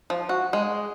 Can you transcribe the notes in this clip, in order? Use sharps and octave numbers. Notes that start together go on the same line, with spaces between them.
F3
F#4
G#3